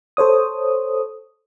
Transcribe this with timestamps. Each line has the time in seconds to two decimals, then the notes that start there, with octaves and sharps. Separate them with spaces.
0.17 A4 C5 C#5 D#6